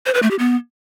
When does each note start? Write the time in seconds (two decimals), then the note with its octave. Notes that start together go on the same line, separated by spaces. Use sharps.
0.06 C5
0.14 B4
0.22 A3
0.31 G4
0.39 B3